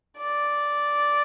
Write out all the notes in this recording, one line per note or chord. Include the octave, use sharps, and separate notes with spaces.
D5